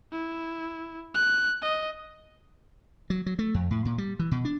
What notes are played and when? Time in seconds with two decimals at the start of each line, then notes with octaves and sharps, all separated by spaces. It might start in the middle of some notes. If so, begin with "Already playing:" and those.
0.12 E4
1.14 F#6
1.62 D#5
3.10 F#3
3.26 F#3
3.39 A3
3.54 F2
3.71 A2
3.85 A#2
3.98 G3
4.19 E3
4.31 B2
4.45 D4